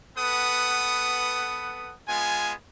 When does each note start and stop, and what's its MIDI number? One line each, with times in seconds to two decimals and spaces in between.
0.18 1.94 59
0.18 1.94 69
0.18 1.94 71
0.18 1.94 78
0.18 1.94 87
2.08 2.52 56
2.08 2.52 59
2.08 2.52 65
2.08 2.52 80